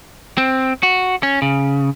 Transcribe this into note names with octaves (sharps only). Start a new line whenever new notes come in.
C4
F#4
C#4
C#3